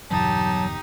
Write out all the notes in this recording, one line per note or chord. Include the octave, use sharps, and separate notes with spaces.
G1 E2 B2 F#3 D#4 G4 A5